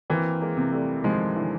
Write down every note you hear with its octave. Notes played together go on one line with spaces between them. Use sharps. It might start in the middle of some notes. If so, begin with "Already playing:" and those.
E3 A#3 C4
G#3 A#3
C3
G3 A3
D#3 F3 G#3
D3 E3